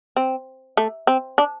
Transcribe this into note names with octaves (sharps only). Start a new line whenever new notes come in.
C4
A3
C4
D4